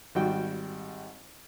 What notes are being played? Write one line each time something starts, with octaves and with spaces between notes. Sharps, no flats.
G#1 G3 F#4 G5